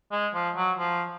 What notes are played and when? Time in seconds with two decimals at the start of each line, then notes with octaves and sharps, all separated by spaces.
0.12 G#3
0.34 F3
0.56 F#3
0.79 F3